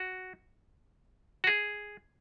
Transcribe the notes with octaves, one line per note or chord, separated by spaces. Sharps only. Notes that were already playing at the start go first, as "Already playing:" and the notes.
Already playing: F#4
F#4
G#4